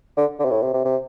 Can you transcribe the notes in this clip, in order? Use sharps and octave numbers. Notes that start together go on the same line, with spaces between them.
D3
D3
C3
A2
C3
C3
C3